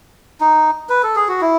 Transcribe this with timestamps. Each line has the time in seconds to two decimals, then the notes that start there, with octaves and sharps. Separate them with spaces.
0.41 D#4
0.89 B4
1.03 A4
1.16 G#4
1.28 F#4
1.41 E4